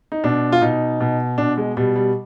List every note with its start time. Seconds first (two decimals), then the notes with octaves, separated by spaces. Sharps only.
0.12 D#4
0.24 B2 D4
0.52 F4
0.61 B2 D#4
1.01 B2
1.38 B2 D4
1.57 G#3
1.77 B2 G3
1.96 G3